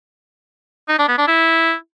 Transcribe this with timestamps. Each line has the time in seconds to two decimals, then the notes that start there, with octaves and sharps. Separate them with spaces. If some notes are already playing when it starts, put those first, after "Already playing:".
0.89 D#4
0.98 D4
1.08 B3
1.18 D4
1.28 E4